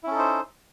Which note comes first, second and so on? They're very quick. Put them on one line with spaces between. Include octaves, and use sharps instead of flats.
E4 C#4 A4 D#4 C5